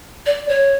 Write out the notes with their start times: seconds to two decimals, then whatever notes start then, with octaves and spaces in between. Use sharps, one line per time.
0.26 D5
0.49 C#5